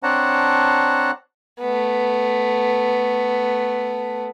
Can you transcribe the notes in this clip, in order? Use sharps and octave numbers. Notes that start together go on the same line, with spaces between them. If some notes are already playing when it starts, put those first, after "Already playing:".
C4 D4 C#5 F#5 A5 A#5
A3 B3